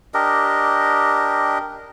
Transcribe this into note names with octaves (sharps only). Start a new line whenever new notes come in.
D4 G4 A#4 D#5